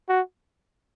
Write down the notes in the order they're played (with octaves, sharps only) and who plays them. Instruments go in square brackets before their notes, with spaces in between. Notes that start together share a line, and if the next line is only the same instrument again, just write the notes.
[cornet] F#4